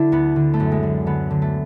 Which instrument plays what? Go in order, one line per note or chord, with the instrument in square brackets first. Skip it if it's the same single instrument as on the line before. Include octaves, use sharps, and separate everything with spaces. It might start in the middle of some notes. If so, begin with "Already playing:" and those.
Already playing: [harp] D3 D4 E4 F#4
D2 B3
D3
A3
F#2
G#3
D3
D3 B3
D3
A3